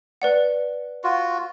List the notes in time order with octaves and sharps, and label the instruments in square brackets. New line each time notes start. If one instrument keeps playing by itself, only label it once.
[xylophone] B4 D5 F#5
[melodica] F4 F#4